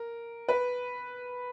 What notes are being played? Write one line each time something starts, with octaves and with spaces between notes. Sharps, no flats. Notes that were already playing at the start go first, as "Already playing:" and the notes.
Already playing: A#4
B4